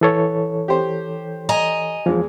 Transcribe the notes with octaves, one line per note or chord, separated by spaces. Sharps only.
E3 A4 C#5
G4 C5
D#5 G#5 A#5
E2 F3 G#3